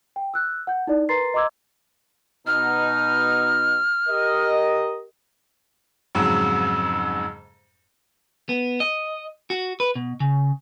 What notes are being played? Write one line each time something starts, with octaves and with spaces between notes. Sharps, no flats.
G5
E6 F#6
F#5 G6
D#4 E4 D5
A#4 B4 A#5 C6 A6 C7
D#5 A#5 C6 D6 E6 G#6
B2 D#4 F6
G4 A#4 D#5
F2 G#2 C#3 F#3
B3
D#5
F#4
B4
B2
C#3